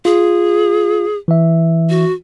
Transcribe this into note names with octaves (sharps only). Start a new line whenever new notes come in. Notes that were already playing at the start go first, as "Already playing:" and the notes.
F4 G#4
E3 E5
F#4